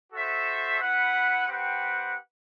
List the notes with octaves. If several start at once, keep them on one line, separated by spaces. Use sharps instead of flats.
F#4 A4 C5 E5
E4 B4 F#5
C4 G4 B4 F#5